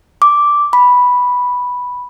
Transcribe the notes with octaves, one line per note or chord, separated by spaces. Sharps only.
D6
B5